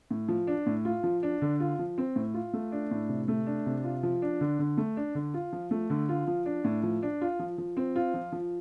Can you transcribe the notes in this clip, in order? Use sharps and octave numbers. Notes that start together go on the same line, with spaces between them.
A2
F3
D4
A2
F4
F3
D4
D3
F4
F3
C4
A2
F4
A3
D4
A2
C3
A3
D4
C3
F4
F3
D4
D3
D3
A3
D4
D3
F4
F3
A3
D3
F4
F3
D4
A2
F3
D4
F4
F3
F3
C4
F4
F3
F3